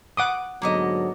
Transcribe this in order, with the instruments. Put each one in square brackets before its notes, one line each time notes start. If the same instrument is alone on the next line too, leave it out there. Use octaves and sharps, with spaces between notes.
[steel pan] F#5 D6 D#6
[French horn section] G#2 D3 F#3 [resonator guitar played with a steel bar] A#3 B3 D#5